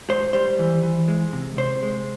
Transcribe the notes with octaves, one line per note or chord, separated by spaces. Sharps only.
G#2 C5
G3 C5
E3
E3
G#3
C3
C3 C5
G#3